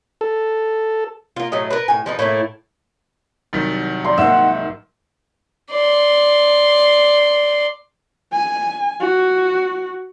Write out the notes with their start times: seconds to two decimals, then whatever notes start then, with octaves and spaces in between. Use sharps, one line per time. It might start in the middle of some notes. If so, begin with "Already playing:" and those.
0.21 A4
1.36 A#3 F4
1.52 A2 F#3 A3 D#5
1.70 A#4 B4
1.88 A2 G#5
2.06 F3 D#4 B4
2.19 A2 A3 A#3 E4
3.53 C2 D#3 F#3 A6 B6
4.05 D5 A#5 C6
4.18 G#2 A#3 E5 F#5
5.71 D5 C6
8.32 G#5
9.00 F#4